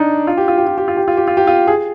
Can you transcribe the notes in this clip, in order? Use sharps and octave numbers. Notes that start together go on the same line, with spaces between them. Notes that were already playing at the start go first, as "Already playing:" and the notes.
Already playing: D4 D#4
F4
G4
F4
G4
F4
G4
F4
G4
F4
G4
F4
G4
F4
G#4